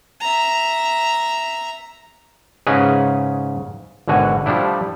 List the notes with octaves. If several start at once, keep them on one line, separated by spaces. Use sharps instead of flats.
E5 A#5
G#2 C#3 C#4 G#4 B4 D#5
G#1 B2 D3 F#4 G#5
F3 G3 A3 D4 E4